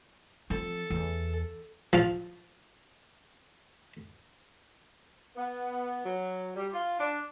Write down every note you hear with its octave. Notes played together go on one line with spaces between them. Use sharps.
F3 C4 A4
E2
F3 F4
B3
F#3
G3
F4
D4